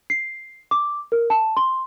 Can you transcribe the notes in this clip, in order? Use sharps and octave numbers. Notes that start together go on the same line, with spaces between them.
C7
D6
A#4
A5
C6